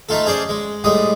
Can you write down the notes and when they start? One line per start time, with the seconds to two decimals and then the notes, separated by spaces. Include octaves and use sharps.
0.09 A3 D#4 F4 A4
0.26 C#4 G#4 C5 D5
0.49 G#3
0.84 A2 G3 G#3 D#6